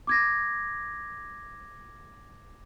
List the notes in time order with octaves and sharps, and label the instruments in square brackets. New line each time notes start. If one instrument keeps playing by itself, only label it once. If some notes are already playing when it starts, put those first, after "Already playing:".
[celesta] D6 G#6 A#6